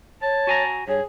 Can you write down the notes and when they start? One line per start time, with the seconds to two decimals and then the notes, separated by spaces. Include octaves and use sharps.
0.22 C#5 A5
0.47 F#4 G#5 A#5
0.88 G2 G#4 C#5